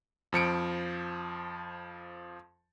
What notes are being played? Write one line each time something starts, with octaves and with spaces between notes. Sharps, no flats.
F2 F3 C#7 D7